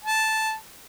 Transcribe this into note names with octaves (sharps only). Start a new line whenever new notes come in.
A5